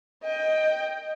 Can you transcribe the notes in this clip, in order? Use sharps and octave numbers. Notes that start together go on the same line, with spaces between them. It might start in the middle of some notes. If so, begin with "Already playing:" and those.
D#5 G5